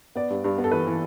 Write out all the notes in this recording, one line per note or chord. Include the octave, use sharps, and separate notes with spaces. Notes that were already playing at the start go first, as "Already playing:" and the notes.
B3 D5
G2
G2
B3
A4
E3 B4
E3